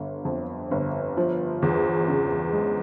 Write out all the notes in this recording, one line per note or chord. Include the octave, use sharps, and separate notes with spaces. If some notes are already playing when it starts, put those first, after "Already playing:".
Already playing: G1 D3
F2
G1
F3
E2
C#3
G#3